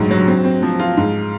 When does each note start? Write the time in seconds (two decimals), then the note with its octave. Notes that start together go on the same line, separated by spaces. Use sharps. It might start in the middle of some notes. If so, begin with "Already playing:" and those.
Already playing: A#1 G#2 F#3
0.11 F#3
0.28 C4
0.44 C4
0.62 F3
0.79 F4
0.97 G#2